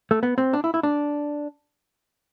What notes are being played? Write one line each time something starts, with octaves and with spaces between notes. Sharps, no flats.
A3
B3
C4
D4
E4
E4
D4